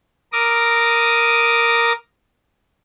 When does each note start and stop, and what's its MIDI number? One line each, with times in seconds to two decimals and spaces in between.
0.32 1.92 70
0.32 1.92 86
0.32 1.92 87